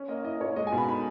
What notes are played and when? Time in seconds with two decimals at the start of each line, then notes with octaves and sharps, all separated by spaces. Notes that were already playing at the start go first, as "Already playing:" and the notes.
Already playing: C#4
0.08 A#3 D#5
0.24 E4 D#5
0.40 A#2 C#5
0.56 G#3 D#5
0.67 G#5
0.72 B2
0.78 B5
0.88 D#4 B5